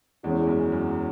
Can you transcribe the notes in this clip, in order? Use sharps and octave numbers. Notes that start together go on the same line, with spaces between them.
E2 E3 G#3 C#4
F#2
F#2